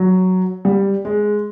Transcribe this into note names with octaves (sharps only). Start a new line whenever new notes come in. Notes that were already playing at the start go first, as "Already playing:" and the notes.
Already playing: F#3
G3
G#3